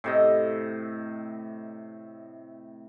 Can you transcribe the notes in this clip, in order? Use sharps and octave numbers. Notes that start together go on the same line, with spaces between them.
A2 C3 D#5